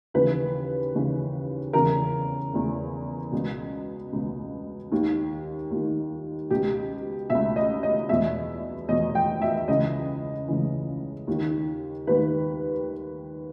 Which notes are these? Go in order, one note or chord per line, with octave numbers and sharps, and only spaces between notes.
D#2 C#3 E3 B4
D#2 C#3 E3
E2 C#3 E3 A#4
E2 C#3 E3
C#2 B2
C#2 B2
D#2 D#3
D#2
D#3
C#2 B2 G4
C#2 B2 E5
D#5
D#5
E2 B2 E5
E2 B2 D#5
G5
E5
C#2 C#3 E3 D#5
C#2 C#3 E3
D#2 D#3
D#2 D#3 B4